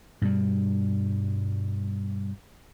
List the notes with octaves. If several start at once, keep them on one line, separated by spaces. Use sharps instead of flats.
G2 B2 G3